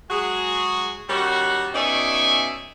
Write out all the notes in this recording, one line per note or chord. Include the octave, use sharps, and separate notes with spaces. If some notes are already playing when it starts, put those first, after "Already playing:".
F#3 G#3 F#4 G#4
D#3 G3 C#4 F#4
B2 C#4 D#4 D5 E5 G#5